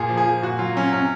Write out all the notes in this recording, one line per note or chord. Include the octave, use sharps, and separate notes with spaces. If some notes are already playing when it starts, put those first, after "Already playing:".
Already playing: A#2 G#4
F3
G#4
F3
A#2 F#4
F#3 F4
F#3 C#4
C3 C#4